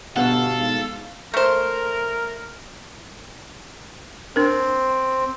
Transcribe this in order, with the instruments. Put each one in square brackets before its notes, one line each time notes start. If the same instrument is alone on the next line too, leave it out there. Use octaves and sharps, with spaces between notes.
[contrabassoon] G1 [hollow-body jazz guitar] B2 F#5 [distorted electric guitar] A4 [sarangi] F5
[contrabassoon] G#2
[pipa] A3 C5 [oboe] A#4
[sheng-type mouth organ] C4 [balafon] D4 A#4